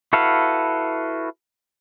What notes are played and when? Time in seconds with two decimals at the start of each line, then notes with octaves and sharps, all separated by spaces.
0.13 E4 F#4 A4 B4 F5